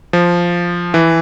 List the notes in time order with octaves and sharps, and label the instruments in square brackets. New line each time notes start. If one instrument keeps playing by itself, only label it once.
[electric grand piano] F3
E3